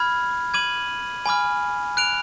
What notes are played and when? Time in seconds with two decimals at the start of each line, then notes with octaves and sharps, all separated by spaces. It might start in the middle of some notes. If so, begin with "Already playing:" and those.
Already playing: B5 F6 G#6
0.54 D6 G#6 D#7 F#7
1.26 G#5 B5 D6 F6
1.97 F#6 D7 F7